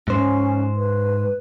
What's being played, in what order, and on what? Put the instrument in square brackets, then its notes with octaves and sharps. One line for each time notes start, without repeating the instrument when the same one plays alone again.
[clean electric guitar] G#2 C5 [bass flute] C#4
[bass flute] B4